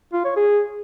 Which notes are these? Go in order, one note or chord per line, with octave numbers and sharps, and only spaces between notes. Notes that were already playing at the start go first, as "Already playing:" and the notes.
F4
C#5
G#4